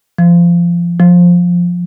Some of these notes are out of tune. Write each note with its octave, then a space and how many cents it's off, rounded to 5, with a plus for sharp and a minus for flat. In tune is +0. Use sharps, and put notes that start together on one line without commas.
F3 -20
F3 +10